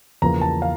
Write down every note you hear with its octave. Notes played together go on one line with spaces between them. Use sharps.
E2 C#3 F3 A#3 A#5
A5
F5